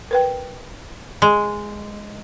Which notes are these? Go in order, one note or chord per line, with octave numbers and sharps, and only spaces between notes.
A#4 B4 G5
G#3